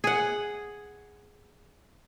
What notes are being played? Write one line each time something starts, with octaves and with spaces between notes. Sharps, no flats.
G#4 F#5